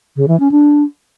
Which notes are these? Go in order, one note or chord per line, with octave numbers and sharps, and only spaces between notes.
C#3
E3
C#4
D4